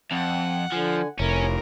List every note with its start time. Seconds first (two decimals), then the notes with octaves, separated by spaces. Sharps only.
0.12 F2 C4 F#5
0.72 D3 F3 G#5
1.20 F1 C#4 E4 A#4 C#5